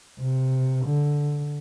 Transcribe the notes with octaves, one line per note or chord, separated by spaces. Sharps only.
C3
D3